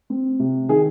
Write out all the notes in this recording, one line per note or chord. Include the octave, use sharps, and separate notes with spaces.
C4
C3
D#3 G#4